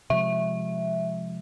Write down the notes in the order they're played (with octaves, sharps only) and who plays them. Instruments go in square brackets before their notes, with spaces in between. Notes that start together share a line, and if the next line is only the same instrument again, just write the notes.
[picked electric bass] C3 F3 G#3 [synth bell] E5